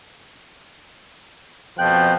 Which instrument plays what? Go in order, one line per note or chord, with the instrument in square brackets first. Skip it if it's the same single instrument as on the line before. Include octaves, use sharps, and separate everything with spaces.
[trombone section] F2 B2 F3 [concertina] G5 F#6